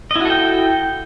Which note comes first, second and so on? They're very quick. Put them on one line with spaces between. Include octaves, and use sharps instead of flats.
D#5 E4 F#4 A4 G5